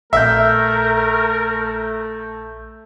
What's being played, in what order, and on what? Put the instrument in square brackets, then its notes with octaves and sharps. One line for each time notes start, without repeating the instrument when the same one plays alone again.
[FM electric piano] A#1 G6 [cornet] A3 [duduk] A#4 [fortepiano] E5